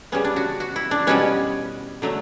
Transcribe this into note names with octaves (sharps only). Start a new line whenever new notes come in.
C#3 G3 B3 C#4
D4
F#4
F#4
E4
D4
B2 G3 B3 C#4
D3 F#3 A3